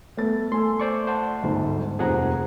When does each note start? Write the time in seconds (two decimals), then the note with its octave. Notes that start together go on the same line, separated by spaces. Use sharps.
0.17 A3 B3 A6
0.52 A3 G#5 C6 E6
0.80 C5 D5 C#6
1.07 C5 F#5 A5
1.42 G1 D2 G#2
1.99 F1 D#2 F3 G#4 F#5 A#5